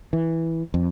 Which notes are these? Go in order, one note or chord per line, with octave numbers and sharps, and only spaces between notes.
E3
F2